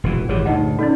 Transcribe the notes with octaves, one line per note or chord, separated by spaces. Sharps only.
E1 A#2 E3
G#1 E3 G4 G#4 C#5
G1 D2 D#4 D#5 F#5
C#4 D#4 A4 B4 D5